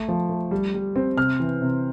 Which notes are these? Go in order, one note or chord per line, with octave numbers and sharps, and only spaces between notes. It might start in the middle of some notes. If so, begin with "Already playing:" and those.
Already playing: A3
F3
A3
G3
G3
C4
C3 F6
E3
C3